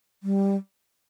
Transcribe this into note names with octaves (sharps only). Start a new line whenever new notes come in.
G3